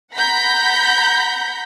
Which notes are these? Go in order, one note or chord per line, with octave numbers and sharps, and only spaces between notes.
F#5 A#5 B5 G6 B6